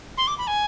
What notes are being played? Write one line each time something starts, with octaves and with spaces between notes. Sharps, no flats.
C6
D6
B5
G#5